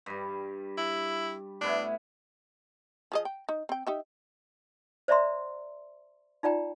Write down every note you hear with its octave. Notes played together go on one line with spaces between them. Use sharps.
G2 G3
E4
A2 B3 D4 E4
F3 G#4 D#5
G5
D#4
C4 G5
D#4 G4 E5
C5 D5 E5 A#5 C6
D#4 F4 D5 G5 A#5